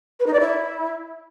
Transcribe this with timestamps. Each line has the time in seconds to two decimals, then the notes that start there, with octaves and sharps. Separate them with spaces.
0.19 B4
0.26 D#4
0.33 D5
0.40 E4